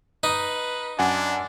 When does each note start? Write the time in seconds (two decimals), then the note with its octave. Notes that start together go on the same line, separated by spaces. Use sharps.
0.23 D#4 B4
0.99 F#2 D4 F#5 G#5